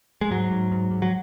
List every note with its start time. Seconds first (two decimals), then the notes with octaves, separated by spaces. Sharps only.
0.21 G#3
0.31 G#2 F#3
0.51 G#2
0.72 G#2
0.91 G#2
1.02 F#3